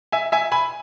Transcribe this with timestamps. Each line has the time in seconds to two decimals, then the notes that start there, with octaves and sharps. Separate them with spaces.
0.12 E5 G#5
0.32 E5 G#5
0.52 G#5 B5